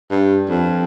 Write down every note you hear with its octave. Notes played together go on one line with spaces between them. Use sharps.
G2
F2